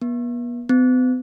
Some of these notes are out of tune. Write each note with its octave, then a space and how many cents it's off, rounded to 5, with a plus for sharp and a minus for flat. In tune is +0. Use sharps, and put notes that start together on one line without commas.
B3 -40
B3 +45